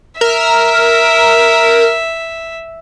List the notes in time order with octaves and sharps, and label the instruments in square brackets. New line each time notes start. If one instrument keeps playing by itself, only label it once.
[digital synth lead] A#4 [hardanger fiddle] E5